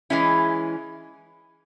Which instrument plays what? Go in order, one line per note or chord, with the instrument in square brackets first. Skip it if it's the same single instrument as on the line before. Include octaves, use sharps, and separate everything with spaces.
[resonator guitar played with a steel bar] E3 G#3 C#4 E4